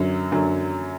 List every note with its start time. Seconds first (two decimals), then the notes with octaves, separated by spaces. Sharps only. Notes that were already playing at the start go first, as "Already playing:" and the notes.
Already playing: F#2 D3 F#3
0.32 F#2 D3 F#3